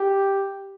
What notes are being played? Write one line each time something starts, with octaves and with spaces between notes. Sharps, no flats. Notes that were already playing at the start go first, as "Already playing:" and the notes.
Already playing: G4